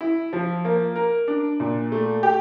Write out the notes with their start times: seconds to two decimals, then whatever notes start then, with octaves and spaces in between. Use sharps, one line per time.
0.01 E4
0.33 F3
0.65 A#3
0.96 A#4
1.28 D4
1.60 A#2
1.92 A3
2.23 G4